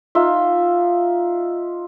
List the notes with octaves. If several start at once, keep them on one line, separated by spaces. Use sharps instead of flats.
D#4 F4 E5